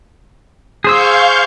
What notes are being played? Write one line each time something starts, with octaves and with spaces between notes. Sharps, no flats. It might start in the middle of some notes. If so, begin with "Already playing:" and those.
G#4 C5 F5 C#6 E6 G6